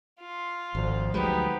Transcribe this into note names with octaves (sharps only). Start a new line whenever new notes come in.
F4
G#1 D2 F3
D2 F#3 G#3 B3 D#4 G4